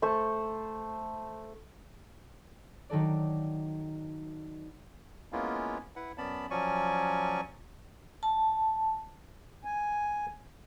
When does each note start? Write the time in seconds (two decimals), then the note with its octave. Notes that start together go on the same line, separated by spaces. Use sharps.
0.02 A3 C5 C#6
2.90 D#3 F#3 A4 D5
5.33 G#3 A#3 B3 C#4 E4 F4
5.96 E4 B4 F#5
6.18 F#2 B3 C#4 D5 A5 B5
6.50 F3 F#3 C#4 D5 G#5 C#6
8.23 A5
9.65 G#5